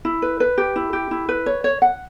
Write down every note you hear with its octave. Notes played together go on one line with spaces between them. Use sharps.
E4
B4
B4
G4
E4
G4
E4
B4
C#5
C#5
F#5